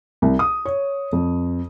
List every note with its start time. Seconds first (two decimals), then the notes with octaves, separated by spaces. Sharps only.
0.22 C2
0.39 D#6
0.65 C#5
1.12 F2